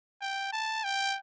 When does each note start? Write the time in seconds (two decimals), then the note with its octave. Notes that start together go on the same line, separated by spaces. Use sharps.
0.21 G5
0.52 A5
0.84 G5